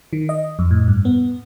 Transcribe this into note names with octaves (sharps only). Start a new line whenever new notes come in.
D#3
D#5
F2
A2
G2
B3